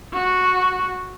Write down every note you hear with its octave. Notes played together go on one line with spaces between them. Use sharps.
F#4